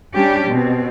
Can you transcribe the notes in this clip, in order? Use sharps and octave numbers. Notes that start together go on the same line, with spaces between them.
G3 C#4 D4 G4
B2 C4